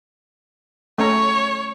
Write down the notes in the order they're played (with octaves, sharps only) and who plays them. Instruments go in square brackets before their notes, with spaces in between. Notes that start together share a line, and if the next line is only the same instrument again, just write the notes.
[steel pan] A3 C#4 A#5 [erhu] C#5